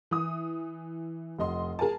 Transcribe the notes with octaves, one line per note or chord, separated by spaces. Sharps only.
E3 D#6
F1 D#5 C6
G#4 A#4 G#5 A5